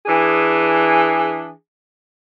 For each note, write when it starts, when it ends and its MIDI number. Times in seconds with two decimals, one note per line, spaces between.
0.06 1.49 52
0.06 1.49 62
0.06 1.49 68